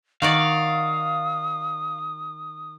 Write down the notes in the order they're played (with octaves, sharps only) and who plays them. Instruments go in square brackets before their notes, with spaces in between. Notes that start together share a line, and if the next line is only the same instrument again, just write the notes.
[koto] D#3 F#4 D5 [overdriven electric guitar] F5 [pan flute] D#6